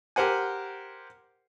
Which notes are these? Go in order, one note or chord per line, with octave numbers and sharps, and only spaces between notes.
G4 A#4 C5 F#5 G#5